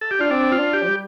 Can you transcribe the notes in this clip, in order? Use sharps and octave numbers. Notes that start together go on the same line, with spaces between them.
A4
G4
D4 F4
C4 D4
F4
D4
G4
F3
G3